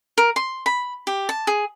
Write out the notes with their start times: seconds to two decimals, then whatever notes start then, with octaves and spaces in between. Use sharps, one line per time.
0.18 A#4
0.36 C6
0.66 B5
1.07 G4
1.29 A5
1.47 G#4